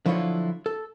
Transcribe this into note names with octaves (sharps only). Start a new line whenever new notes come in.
D3 F3 F#3 E4 F4 C#5
A4